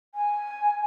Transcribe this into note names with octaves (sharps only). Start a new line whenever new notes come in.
G#5